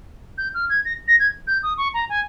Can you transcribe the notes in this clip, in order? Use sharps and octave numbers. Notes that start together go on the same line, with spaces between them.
G6
F6
G#6
A#6
A#6
G#6
G6
D#6
C#6
A#5
G#5